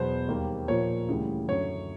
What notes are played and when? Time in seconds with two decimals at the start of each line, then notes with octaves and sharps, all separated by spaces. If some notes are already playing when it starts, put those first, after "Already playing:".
Already playing: E2 B2 F#3 B3 C5
0.28 D#2 D#3 G3 A#3
0.68 A#2 F3 A#3 C#5
1.09 D2 C#3 E3 G3
1.48 F#2 D3 F#3 C#5